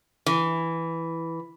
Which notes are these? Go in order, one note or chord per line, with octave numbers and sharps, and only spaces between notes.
E3